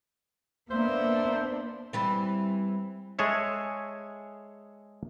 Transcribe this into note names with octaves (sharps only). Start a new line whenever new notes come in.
A#3 B3 D4 C5 E5
E3 G3 C4
G#3 G#4 A4 C#5 E5